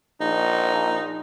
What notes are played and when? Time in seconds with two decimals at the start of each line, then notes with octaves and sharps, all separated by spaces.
0.21 A#1 D#4